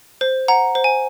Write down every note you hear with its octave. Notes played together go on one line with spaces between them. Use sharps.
C5
F#5 A#5
C5
G#5